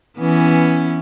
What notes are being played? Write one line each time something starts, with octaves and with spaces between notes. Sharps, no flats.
E3 B3 C#4